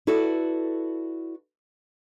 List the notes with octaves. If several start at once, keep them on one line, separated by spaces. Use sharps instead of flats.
E4 F#4 A4 B4 D5